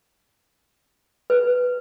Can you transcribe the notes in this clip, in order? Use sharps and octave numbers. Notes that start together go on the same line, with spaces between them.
B4